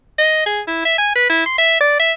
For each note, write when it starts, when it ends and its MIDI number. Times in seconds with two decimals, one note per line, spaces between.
0.19 0.43 75
0.46 0.61 68
0.68 0.84 64
0.85 0.94 76
0.98 1.14 80
1.16 1.28 71
1.30 1.44 64
1.46 1.56 84
1.58 1.79 76
1.81 1.97 74
2.00 2.12 76